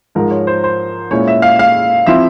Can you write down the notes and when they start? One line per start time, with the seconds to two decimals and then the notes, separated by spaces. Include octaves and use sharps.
0.15 G#2 F3 G#3 A#4
0.31 C#5
0.47 C5
0.64 C5
1.11 A#2 G#3 C#4 E4 C#5
1.28 E5
1.42 F5
1.59 F5
2.07 F3 C4 E4 E5